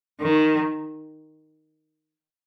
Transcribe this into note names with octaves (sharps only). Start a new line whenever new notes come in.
D#3